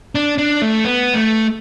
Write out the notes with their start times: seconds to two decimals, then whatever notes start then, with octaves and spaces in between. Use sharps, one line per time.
0.15 D4
0.38 D4
0.62 A3
0.84 B3
1.14 A3